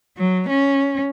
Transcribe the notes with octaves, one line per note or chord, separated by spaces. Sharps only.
F#3
C#4